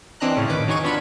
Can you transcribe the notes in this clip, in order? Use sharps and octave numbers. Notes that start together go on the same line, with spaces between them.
E3 C4 D4 D#5 A#5 F#6
A2 C#3
F2 D#3 B4 D6
F#3 D#4 G#4 C#6 D#7
F#3 B3 D4 F4 B5 C#6